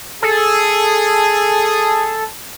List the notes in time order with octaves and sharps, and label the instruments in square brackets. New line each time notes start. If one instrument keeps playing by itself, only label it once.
[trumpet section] G#4 [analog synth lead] A4